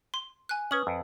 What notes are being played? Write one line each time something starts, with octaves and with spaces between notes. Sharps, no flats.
C6
G#5 F#6
C#4 B4 D#6 F#7
F2